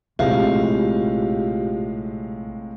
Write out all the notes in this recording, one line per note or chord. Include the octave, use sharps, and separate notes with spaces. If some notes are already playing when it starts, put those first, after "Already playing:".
A#1 A2 C3 G#3 F4 G4 F5